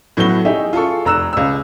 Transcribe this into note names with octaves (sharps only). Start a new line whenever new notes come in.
A2 F#3 A3 B3 F#4 G7
D#4 E4 G4 G#4 E5
F4 G#4 A4 C#6
F1 A#5 E6 F#6 E7
C#2 E6